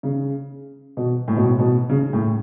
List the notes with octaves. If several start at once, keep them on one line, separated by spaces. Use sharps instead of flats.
C#3
B2
A2
B2
A2
B2
C#3
A2